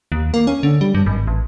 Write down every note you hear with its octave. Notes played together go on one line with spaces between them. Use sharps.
D#2
A#3
C#4
D3
G3
G2
G#1
A1